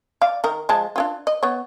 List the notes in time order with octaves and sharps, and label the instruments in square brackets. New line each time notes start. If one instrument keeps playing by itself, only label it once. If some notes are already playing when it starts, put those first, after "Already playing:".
[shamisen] D5 F5
D#3 A#4
F3 G#3 A5
D4 E4 F4
D#5
B3 C#5